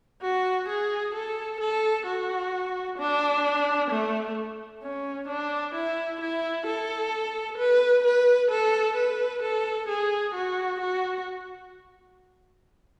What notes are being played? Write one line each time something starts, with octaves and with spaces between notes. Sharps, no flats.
F#4
G#4
A4
A4
F#4
D4
A3
C#4
D4
E4
E4
A4
B4
B4
A4
B4
A4
G#4
F#4
F#4